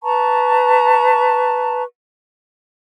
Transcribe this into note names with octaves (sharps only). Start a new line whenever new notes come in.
B4 A5 A#5 C#6